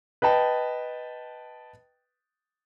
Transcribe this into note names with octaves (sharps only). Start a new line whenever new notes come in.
B4 D#5 G5 A5